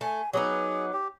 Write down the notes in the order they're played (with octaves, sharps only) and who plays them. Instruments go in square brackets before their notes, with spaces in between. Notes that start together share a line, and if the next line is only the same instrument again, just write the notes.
[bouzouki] A3 [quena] G#5
[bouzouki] F#3 B3 D#4 [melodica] G#4 [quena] D6
[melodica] G4